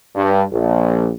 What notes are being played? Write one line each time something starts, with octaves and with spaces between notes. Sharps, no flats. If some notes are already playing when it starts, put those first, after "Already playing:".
G2
A#1